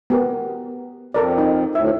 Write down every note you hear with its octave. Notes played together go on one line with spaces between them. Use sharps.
B3 G4 A#4
F2 A4 A#4 D5
D#4
D2 A2 E5